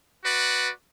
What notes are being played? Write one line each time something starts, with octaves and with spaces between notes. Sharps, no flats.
F#4 B4 D5